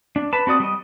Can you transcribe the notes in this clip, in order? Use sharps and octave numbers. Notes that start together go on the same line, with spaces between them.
D4
B4 A5
C4 F#4 D5 D#6
G3 D#5